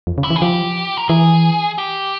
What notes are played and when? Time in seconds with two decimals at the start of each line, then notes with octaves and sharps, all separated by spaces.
0.07 F2
0.18 C#3
0.24 E4
0.30 E3
0.36 G#4
0.41 F3 G4
0.97 A#4
1.09 E3 G#4
1.78 G4